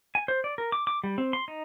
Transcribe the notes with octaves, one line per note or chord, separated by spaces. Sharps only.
G#5
C5
D5
A#4
D6
D6
G3
C4
C6
D#4